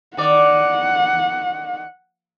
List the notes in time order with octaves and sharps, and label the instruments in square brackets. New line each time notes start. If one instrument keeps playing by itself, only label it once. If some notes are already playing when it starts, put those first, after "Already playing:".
[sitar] D#3 D5 [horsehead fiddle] F#5